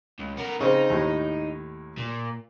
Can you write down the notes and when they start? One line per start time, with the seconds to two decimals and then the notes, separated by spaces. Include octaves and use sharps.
0.19 C#2
0.38 B3 A#4
0.61 C#3 C4 D#4
0.90 D#2 A2
1.98 A#2